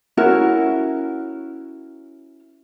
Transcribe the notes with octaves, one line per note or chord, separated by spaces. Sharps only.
C#4 E4 F#4 A#4